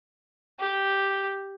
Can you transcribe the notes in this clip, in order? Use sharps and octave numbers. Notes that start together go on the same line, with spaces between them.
G4